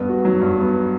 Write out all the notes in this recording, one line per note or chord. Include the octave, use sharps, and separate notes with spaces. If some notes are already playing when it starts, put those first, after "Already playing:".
Already playing: G2 B3
F#4
F#3
G2
B3